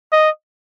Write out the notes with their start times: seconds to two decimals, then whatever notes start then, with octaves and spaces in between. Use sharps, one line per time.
0.12 D#5